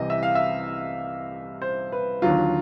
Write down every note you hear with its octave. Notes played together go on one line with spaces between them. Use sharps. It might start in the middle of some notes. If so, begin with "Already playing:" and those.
Already playing: C2 C3 E3 D#5
E5
F5
E5
C5
B4
D#2 D3 F#3 F4